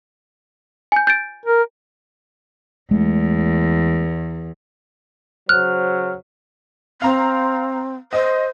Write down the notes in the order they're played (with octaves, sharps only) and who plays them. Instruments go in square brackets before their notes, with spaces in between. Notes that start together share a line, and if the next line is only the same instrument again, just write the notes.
[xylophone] G#5 G6
G6 A6 D7
[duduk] A#4
[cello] E2 [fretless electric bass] G#3 A3
[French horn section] C#3 C5 [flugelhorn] F#3 [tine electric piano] F6 [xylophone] F#6
[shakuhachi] C4 [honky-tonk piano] F5 A#5
[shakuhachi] C5 [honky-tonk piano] D#5